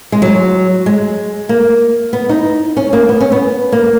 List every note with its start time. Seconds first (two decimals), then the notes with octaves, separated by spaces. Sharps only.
0.12 G#3
0.22 F#3
0.86 G#3
1.49 A#3
2.13 B3
2.29 D#4
2.77 C#4
2.93 A#3
3.09 B3
3.21 C#4
3.32 B3
3.72 A#3